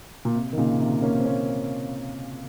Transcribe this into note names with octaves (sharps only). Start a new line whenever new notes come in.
A#2
C3
D#3
A#2 C#3
C3 D#3
A#3 C#4
C4
A#3 C#4